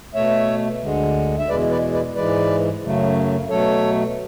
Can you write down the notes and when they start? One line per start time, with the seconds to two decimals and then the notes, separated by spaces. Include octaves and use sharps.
0.14 B2 A3 C#5 E5
0.82 D2 D3 G#3
1.39 E5
1.49 E2 B2 G#3 B4 D5
1.71 B4 D5
1.93 B4 D5
2.16 G#2 E3 G#3 B4 D5
2.83 F#2 C#3 F#3 A3
3.49 B2 F#3 A3 A4 C#5